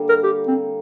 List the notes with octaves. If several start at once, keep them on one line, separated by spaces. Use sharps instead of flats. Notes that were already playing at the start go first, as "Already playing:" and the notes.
Already playing: D3 G3 A#3
A#4
G4
C4